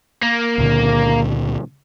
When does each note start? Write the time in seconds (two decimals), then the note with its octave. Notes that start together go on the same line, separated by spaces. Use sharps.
0.22 A#3
0.58 C#2 A#2 D3